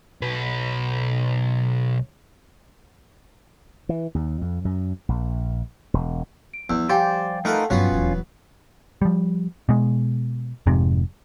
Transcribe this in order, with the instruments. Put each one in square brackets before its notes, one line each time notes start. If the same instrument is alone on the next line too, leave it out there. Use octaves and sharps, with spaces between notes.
[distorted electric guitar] B1 B4
[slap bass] E3
D#2
F2
F#2
A#1
E1
[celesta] D7
[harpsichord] E2 [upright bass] F3 G3 [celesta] E6
[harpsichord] G4 [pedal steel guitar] C5 D5 [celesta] F5 G5 G#5
[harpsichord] A3 F4 F#5 [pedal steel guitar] D#4 A#4 B4
[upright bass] G2 F3 [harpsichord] F#3 B3 [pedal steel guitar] C#4 F4
[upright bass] D#1 E2
[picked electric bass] F3 G3
B2 G#3
F1 F2 G#2 C3